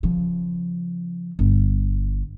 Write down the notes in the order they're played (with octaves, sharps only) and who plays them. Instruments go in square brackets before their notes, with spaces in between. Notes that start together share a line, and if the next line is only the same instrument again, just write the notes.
[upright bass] C#3 F3
G1